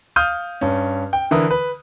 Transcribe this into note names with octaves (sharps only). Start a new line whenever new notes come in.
F5 D#6 F6 G6 D#7
G2 C#4
G5
D3 E3 E4 A#4 D#6
B4